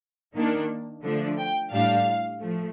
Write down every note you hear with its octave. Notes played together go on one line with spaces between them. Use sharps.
D#3 A#3 D4
D3 F3 A3 D4
G5
A2 G3 D4 F5
F3 A3